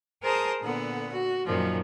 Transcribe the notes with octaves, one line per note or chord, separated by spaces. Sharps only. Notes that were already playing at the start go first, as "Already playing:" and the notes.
G#4 A#4 C5 A5 A#5 D#6
A#2 D3 B3 F#5
F#4
F#2 A#2 D#3 F3